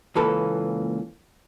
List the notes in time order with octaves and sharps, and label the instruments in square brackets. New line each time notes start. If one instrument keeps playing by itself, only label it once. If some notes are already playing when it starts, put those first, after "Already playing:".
[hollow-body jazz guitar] C#2 A#2 E3 A#3 A4 B4